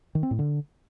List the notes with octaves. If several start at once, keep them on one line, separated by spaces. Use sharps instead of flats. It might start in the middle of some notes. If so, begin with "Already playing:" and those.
D#3
C4
A2
D3